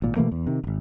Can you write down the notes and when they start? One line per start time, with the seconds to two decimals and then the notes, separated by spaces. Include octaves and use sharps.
0.02 G#1 A#2
0.16 B2 E3 A3 A#3
0.31 E2
0.46 C3 D#3
0.64 D#1 G#1